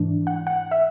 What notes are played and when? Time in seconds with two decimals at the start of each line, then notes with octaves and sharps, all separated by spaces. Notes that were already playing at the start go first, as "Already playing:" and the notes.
Already playing: G#2 E3 A3 D4
0.27 F#5
0.47 F#5
0.71 E5